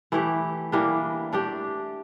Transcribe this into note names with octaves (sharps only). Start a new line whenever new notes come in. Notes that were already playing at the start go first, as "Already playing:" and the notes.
E3 A3 E4 G4
E3 G3 A#3 D4
A3 D4 G4